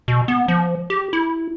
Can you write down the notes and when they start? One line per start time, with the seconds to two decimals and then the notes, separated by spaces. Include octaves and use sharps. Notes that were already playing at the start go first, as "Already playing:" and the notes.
0.08 B2
0.28 B3
0.48 F3
0.90 G4
1.13 E4